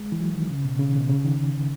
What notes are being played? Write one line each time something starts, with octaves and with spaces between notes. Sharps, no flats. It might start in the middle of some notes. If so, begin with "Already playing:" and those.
Already playing: G#3
E3
F#3
D#3
C#3
B2
C#3
D#3
B2
C#3
D#3